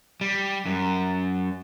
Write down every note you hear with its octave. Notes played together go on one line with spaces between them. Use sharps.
G3
F#2